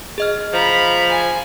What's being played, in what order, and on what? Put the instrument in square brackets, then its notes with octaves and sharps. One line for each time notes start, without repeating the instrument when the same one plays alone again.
[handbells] G#4 D#5 F6
[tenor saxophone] F3 [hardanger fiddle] A#5 B5
[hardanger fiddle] G#5